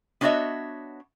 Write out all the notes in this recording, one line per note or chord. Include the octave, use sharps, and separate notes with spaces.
B3 D4 F#4 C#5 D#5 E5